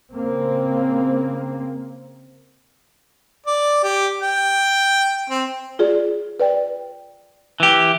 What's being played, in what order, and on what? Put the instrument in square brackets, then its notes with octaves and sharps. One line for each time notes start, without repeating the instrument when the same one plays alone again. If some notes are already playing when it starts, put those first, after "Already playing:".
[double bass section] C#3 A#3 C4
[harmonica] D5
G4
G5
C4
[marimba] F4 G#4 D5
B4 D5 G5
[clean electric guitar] E3 G4